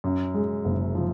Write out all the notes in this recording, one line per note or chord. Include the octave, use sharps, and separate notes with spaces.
F#2
G#3
F#1
F3